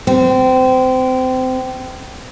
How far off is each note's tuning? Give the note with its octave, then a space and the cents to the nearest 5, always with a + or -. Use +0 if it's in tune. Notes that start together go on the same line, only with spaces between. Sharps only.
C4 -25